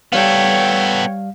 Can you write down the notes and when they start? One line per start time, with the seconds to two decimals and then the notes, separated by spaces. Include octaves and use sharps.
0.13 G3 B3 A4 C#5 F5 G5